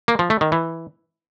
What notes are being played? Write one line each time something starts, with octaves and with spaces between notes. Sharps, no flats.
A#3
F3
A3
D#3
E3